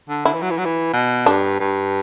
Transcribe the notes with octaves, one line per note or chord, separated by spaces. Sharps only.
D3
D3 E4
E3
F#3
E3
F#3
E3
B2
G2 D4
G2